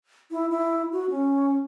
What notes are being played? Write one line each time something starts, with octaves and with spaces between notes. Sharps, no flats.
E4
E4
F#4
C#4